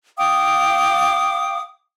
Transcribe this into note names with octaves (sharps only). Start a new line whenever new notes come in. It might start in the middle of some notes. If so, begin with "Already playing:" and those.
F5 G5 D6 D#6